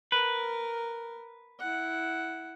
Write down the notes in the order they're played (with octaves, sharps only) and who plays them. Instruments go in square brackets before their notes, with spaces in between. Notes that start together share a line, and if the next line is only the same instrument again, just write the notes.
[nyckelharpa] A#4 [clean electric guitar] B4
[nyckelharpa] E4 F#5